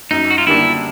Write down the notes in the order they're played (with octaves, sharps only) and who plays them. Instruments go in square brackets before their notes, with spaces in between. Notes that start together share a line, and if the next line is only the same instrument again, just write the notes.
[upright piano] F#2 [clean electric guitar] D#4
[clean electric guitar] F#4
F4
[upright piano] D3 G3 A#3 D4 [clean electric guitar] E4